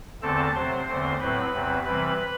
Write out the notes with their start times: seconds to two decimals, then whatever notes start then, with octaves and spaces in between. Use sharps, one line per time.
0.22 E2 D3 A3 C4 A4 A5
0.55 C3 F#3 C4 C5 C6
0.88 E2 D3 A3 C4
1.20 A2 F#3 C4 B4 B5
1.53 E2 C3 F#3 C4
1.85 C3 E3 G3 C4 B4 B5